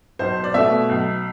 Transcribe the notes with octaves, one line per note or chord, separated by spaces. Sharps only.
B1 C5
D5
B2 A3 E5
B1